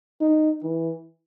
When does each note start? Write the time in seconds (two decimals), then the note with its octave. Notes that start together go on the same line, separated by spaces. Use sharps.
0.21 D#4
0.63 E3